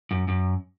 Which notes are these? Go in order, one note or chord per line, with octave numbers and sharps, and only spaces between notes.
F#2
F#2